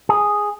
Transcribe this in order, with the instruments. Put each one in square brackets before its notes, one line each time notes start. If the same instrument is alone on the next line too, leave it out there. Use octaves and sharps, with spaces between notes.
[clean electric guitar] G#4